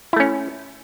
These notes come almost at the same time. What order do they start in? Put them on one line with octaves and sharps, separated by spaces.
E4 A3 C#4